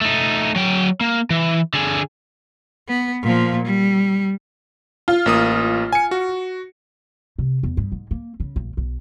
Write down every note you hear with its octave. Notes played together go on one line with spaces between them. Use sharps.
A3 D#4
F#3 G5
A#3
E3
D3 G#4
B3
A#2 F3
G3
F4
A1 A#3 D#6
G#5 C#7
F#4
C3
E2
G2
G#2
A#3
C#3
A#1
B1